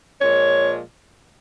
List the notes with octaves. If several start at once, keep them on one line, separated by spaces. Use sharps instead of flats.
A#2 F3 G#3 C#5